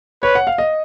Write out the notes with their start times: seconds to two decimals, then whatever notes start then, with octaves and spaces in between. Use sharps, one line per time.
0.23 B4 C#5
0.35 F#5
0.47 F5
0.58 D#5